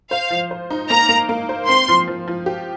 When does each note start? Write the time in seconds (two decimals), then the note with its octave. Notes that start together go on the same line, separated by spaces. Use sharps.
0.11 C5 F5
0.30 F3
0.51 C5
0.70 D#4
0.90 A#3 A#5
1.09 A#3
1.29 A#3
1.49 C5
1.68 C4 C6
1.88 F3
2.08 F3
2.28 F3
2.46 G4